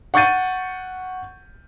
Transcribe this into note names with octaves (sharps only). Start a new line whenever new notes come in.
F#5 C#6 G6 A6 D#7